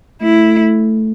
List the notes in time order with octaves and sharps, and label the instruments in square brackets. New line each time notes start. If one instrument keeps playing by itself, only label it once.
[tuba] A3 [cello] E4